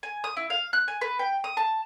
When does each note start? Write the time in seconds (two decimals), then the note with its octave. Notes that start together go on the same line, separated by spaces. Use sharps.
0.03 G#5
0.24 D#6
0.37 E4
0.50 F5
0.73 F#6
0.88 G#5
1.01 B4
1.19 G5
1.44 D#6
1.57 A5